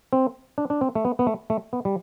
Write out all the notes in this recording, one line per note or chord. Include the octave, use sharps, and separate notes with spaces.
C4
D4
D4
C4
A3
B3
B3
A3
A3
B3
G3